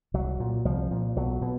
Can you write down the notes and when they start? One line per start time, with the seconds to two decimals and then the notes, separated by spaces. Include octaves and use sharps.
0.14 C2 F#3
0.40 A#2
0.65 C2 F3
0.91 A#2
1.16 B1 F#3
1.42 B2